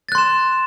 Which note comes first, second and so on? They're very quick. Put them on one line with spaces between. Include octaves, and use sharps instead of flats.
A6 F#6 C6 E7